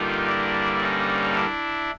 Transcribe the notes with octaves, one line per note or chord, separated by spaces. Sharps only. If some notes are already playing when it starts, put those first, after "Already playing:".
Already playing: G2 D3 G3 A#3 D#4 F4
D4 E4
C#4 D#4
D4 E4